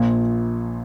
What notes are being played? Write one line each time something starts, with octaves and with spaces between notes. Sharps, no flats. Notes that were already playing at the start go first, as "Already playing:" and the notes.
Already playing: A#1 A#2 F3